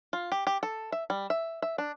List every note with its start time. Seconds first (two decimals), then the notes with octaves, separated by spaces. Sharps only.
0.13 F4
0.32 G4
0.47 G4
0.63 A4
0.92 E5
1.10 G3
1.30 E5
1.62 E5
1.78 D4